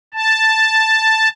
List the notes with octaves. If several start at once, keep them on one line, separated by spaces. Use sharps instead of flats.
A5